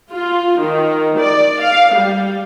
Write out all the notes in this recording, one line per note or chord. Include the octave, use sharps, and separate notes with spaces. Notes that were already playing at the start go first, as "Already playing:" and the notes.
F4
D#3
D5
F5
G3